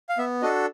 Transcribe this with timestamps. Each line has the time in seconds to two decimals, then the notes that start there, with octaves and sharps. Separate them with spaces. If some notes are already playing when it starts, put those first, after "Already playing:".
0.09 F5
0.18 B3 E5
0.42 D4 F#4 A4 D#5